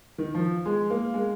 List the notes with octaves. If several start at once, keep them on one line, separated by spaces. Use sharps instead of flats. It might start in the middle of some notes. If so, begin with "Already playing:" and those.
D#3
F3
G#3
A#3
G#3